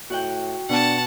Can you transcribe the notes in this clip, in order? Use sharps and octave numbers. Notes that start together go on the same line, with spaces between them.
A2 F#4 F#5 G5
B2 D4 F#5 A5